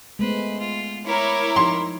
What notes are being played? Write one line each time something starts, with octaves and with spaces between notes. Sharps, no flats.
G#3 A3 B3 B4 C5
F4
E4 A#4 C#5 D6
F3 D#4 C6